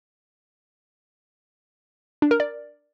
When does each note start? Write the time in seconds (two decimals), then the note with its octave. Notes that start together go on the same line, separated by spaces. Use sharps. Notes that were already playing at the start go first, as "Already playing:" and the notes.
2.22 D4
2.31 A#4
2.40 D5